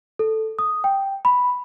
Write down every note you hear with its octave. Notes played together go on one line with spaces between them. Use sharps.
A4
D#6
G5
B5